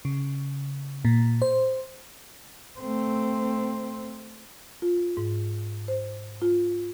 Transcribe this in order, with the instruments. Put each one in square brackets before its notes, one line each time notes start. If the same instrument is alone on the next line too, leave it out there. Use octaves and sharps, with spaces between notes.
[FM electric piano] C#3
A#2
C5
[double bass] A3 C4
[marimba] F4
G#2
C5
F4